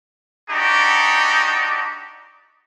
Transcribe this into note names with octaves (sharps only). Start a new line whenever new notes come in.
D4 D#4 F#4 G4